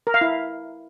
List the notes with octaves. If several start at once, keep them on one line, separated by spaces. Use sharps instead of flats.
A#4
F5
E4